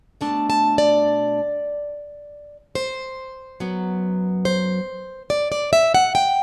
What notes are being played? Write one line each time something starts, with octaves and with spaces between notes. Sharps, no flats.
B2 A3 D4 A5
A5
D5
C5
F#2 F#3 B3
C5
D5
D5
E5
F#5
G5